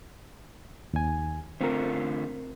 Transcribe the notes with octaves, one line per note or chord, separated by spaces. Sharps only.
D#2 G#5
D3 A3 C4 F4 A#4